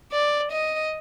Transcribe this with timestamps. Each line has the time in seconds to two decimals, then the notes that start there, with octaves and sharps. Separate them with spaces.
0.12 D5
0.52 D#5